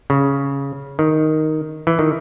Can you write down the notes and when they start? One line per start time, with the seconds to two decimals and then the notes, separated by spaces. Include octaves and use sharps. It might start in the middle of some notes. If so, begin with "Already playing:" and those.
0.10 C#3
0.99 D#3
1.87 E3
1.99 D#3